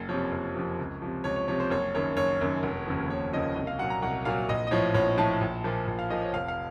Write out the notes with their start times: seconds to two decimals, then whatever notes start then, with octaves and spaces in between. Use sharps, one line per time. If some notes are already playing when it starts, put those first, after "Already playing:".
Already playing: F#1
0.09 F2 C3 F3 C#5
0.32 F#1
0.55 F2 C3 F3
0.79 C#2
1.02 C3 F3
1.24 C#2 C#5
1.36 C#5
1.48 C3 F3 C#5
1.60 C5
1.70 F#1 C#5
1.95 F#2 D#3 C#5
2.17 F#1 C#5
2.40 F#2 D#3
2.63 F1
2.87 D#2 C#3 F3
3.09 F1 C#5
3.33 D#2 C#3 F3 D#5
3.56 C2 D#5
3.67 F5
3.79 A#2 F#3 F#5
3.90 A#5
4.02 C2 F#5
4.25 A#2 F#3 F5
4.49 A#1 D#5
4.67 D#5
4.71 A2 F3 C#5
4.94 A#1 C#5
5.18 A2 F3 A5
5.41 A#1
5.64 A#2 F3
5.87 A#1
5.99 F5
6.10 A#2 F3 D#5
6.22 C#5
6.33 F1 F5
6.48 F5